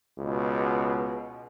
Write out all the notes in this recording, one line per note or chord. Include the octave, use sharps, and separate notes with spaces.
C#2 B2